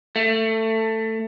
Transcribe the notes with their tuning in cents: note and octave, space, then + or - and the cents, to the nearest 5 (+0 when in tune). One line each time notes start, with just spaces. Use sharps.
A3 +15